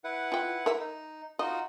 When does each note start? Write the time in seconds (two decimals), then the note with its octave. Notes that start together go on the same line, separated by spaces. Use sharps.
0.04 E4 B4 F#5
0.32 F4 G5
0.66 A#4 E5
0.80 D#4
1.39 D#4 F4 F#4 D#5